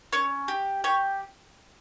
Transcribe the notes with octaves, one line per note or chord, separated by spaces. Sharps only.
C#4 C#5
G4
G4 C#5